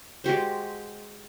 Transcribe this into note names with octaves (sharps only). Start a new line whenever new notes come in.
G#3 F#4 G4 C5